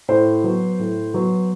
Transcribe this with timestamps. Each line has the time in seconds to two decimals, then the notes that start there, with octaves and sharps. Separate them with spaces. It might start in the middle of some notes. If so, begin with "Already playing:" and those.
0.08 A2 C5
0.44 F#3 B3
0.79 A2
1.14 F#3 B3